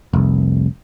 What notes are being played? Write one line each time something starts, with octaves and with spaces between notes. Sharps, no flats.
F1 C2